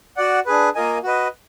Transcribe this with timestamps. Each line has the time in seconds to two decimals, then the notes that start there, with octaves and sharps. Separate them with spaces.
0.17 F#4 D5 F#5
0.46 D4 G#4 B4
0.75 A#3 F4 A#4 D#5 G#5
1.04 F#4 B4 D#5